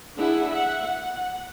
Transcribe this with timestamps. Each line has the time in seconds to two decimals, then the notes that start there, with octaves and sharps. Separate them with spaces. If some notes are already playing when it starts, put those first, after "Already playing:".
0.19 D4 E4 G#4 F#5
0.50 E5 F#5
0.83 F#5